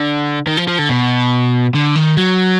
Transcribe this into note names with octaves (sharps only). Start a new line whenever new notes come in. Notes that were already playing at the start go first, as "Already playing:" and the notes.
Already playing: D3
D#3
F3
F3
D3
B2
D3
D#3
F#3